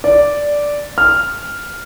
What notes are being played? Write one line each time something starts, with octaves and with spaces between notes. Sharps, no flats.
D5
F6